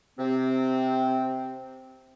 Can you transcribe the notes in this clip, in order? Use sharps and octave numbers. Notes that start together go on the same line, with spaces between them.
C3 C4